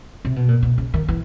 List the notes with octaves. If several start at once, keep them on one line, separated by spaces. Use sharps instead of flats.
C3
B2
A#2
B2
C#3
D#3
E3